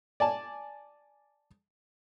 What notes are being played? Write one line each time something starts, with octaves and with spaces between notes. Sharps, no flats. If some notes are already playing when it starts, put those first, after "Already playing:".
D5 G#5 A5